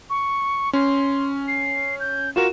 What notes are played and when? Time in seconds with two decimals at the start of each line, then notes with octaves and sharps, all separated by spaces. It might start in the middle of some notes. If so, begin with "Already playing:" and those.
0.10 C#6
0.73 C#4 C6
1.48 C7
2.00 G6
2.36 F4 F#4 A#4 E7